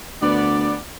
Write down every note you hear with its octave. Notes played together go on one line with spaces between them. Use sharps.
D2 B3 D5